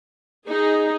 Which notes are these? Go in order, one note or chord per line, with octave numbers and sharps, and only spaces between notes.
D#4 G#4